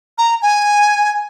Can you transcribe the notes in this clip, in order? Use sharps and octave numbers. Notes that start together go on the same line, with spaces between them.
A#5
G#5